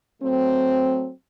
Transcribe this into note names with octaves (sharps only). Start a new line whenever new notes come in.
F#3 A3 C4